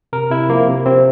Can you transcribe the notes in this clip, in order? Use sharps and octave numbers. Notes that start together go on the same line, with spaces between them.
C3 A#4
C3 E4
F3 A#3
C3
C3 C4